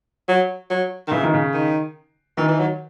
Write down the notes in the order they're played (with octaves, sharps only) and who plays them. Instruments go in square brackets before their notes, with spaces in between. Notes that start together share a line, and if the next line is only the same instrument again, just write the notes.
[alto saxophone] F#3
F#3
D#3
[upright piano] C#3 [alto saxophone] E3
[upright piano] D#3
C#3
[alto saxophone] D#3
[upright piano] D#3 [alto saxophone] E3
[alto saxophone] E3
F#3